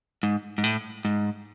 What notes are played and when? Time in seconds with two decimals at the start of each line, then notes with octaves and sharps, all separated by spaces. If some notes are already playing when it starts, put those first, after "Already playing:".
0.23 G#2
0.58 G#2
0.64 A2
1.05 G#2